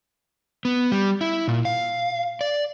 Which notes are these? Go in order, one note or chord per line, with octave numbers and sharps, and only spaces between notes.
B3
G3
E4
A#2
F5
D5